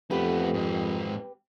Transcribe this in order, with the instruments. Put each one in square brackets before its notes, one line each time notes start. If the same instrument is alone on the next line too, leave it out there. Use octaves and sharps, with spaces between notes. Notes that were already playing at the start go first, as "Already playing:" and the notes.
[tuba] F2 [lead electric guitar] A3 B3 [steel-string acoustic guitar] G4 B4
[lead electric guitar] G#2 C4